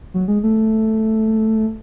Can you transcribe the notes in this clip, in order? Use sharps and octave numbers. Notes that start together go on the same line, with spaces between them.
F#3
G#3
A3